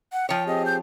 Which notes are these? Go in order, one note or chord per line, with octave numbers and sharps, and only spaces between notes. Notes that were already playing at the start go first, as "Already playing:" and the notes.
F#5
F3 C#5 G5
C4 G4 G#4 D#5
G6